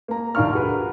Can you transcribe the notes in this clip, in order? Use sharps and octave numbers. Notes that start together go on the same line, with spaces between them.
A#3 A#5
A#1 D#2 D4 F5 C#6 F6
F#4 G#4 A#4 B4